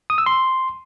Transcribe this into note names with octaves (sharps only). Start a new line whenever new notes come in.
D#6
E6
C6